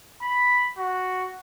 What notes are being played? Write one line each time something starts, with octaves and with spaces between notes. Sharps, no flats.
B5
F#4